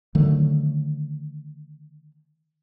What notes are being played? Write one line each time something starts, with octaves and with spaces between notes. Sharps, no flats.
D3 D#3 F#3 A3